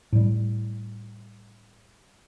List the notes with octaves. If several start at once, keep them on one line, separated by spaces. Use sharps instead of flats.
A2 G3